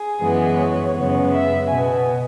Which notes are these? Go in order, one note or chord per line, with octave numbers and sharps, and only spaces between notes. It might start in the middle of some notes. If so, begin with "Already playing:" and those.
Already playing: G#4
F#2 E3 G#3 B3
C#5
F#2 C#3 G#3 B3
E5
B2 B3 G#5